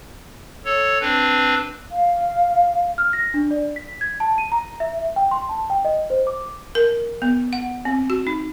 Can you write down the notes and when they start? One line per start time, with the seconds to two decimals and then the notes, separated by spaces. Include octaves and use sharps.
0.65 A4 C#5
1.01 C4 D4 B4
1.92 F5
2.98 F6
3.13 A#6
3.34 D4
3.51 D5
3.76 B6
4.01 G#6
4.20 A5
4.38 D#7
4.52 A#5
4.80 E5
5.16 G5
5.31 C6
5.49 A5
5.70 G5
5.85 D#5
6.10 C5
6.27 D6
6.75 A#4
7.22 B3
7.53 F#5
7.85 C4
8.10 F#4
8.27 D#4